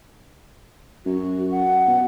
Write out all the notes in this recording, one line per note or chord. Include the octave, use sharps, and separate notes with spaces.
F#2 F#4
F#5
B2